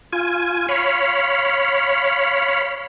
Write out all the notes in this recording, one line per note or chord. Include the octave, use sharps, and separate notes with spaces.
F4 G#5
C#5 F5 B5